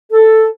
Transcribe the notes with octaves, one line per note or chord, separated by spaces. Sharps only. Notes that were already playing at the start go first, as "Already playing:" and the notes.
A4